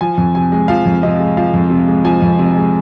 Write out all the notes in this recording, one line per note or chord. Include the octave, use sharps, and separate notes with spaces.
F3 G#5
F2
C3 G#5
G#3
F3 F5
F2
C3 D#5
G#3
F3 F5
F2
C3
G#3
F3 G#5
F2
C3
G#3